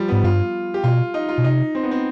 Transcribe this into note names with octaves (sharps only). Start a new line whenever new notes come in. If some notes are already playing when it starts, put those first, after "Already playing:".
Already playing: F3 G3
G#2 B3
G2 F4
G4
B2 F4
D#4
F4
B2
C3 D#4
C4
B3
C4